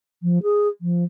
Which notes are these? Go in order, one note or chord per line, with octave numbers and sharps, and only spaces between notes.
F3
G#4
F3